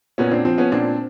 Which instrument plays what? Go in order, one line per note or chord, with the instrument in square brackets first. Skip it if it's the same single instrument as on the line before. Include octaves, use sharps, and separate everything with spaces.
[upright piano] A#2 B3 C#4
C4 D4
F3 C4
B3 C#4
A#2 C4 D4